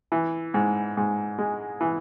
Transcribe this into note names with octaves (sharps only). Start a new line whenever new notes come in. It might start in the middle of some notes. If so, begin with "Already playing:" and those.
E3
G#2
G#2
G#3
E3